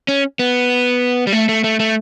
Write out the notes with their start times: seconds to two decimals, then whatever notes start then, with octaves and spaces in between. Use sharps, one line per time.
0.08 C#4
0.39 B3
1.27 G3
1.33 A3
1.49 A3
1.64 A3
1.80 A3